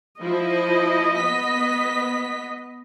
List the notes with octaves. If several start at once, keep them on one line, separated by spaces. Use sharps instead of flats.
F3 E4 D#5
B3 B6